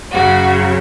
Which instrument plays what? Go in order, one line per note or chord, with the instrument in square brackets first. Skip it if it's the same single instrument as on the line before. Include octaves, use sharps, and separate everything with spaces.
[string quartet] F#2 C#3 F#3 F#4